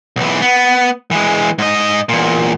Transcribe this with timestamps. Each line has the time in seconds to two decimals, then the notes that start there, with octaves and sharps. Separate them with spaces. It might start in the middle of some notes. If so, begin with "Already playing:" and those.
0.16 B1 E3
0.42 B3
1.11 E3 G#3
1.58 G#2 D#5
2.09 E2 A#2